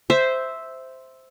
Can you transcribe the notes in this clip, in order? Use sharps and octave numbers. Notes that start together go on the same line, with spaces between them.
C5 E5